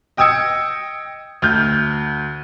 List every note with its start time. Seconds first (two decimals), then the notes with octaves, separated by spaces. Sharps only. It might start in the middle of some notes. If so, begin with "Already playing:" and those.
0.17 D#5 G5 D#6 E6 G#6 C#7
1.42 D2 F6 G6